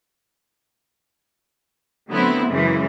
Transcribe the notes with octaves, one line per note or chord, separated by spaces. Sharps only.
D3 F#3 A3 B3 C4 E4
F#2 C#3 E3 G#3